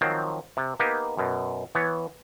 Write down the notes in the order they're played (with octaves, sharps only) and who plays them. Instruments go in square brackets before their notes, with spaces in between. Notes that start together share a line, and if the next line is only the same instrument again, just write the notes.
[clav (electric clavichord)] D#3 F3 F#3 C4
C3
A#3 B3 D#4 G4
F#2 B2
E3 B3 C#5